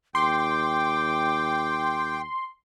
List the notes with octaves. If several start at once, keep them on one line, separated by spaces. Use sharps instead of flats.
D#2 G5 C6 D6